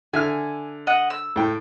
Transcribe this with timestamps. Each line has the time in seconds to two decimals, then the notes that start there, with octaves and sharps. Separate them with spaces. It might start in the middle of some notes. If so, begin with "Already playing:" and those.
0.13 D3 E5 G#5 F6
0.87 D#5 F#5
1.10 E6
1.36 A2 G5